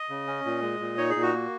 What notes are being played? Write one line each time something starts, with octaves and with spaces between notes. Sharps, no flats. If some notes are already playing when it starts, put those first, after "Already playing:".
Already playing: D#5
C#3
C#4
A#2
G#3
A#2
D#4 C#5
G#4
A#2
F#4
A#3